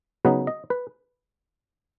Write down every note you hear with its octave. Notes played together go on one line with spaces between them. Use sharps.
C#3 F#3 B3 D#4 B4
D#5
B4